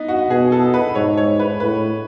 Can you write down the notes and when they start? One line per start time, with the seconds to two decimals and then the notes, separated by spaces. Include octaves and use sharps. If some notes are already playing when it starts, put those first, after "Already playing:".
Already playing: B3 D#4
0.08 F#4
0.30 B2 G#4
0.52 A4
0.74 B4
0.95 G#2 C#5
1.17 C#5
1.39 B4
1.60 A2 B4